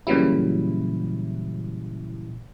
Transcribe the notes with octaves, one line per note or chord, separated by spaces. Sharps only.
A#2 C#3 E3 F#3 G3 E4